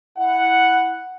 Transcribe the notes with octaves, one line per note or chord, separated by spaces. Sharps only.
E4 F#5